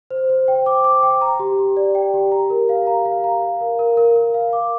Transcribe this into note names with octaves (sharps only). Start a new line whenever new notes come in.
C5
C5
G5
D6
D6
G5
A#5
G4
G4
D5
G5
G4
A#5
A#4
F5
A#5
F5
A#5
F5
A#4
A#4
A#4
A#4
F5
D6